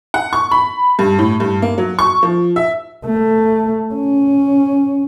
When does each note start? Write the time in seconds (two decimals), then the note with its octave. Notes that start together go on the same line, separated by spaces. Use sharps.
0.14 F#5
0.33 C#6
0.51 B5
0.99 G2
1.19 A2
1.40 G2
1.62 A#3
1.78 F#3
1.99 C#6
2.23 F3
2.56 E5
3.05 A3
3.94 C#4